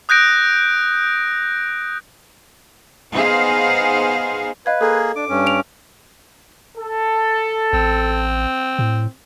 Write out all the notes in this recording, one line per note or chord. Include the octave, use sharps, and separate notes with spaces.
D#6 F#6 G6 A#6 D7
B3 D#4 G#4 C5 F5
B4 D#5 F5 G#6
A#3 G#4 A4 G#6
D4 D6
G2 C#4
C#5 D7 F7
A4
A1 C4
A2